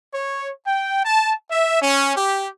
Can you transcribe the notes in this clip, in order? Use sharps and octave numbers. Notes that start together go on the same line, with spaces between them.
C#5
G5
A5
E5
C#4
G4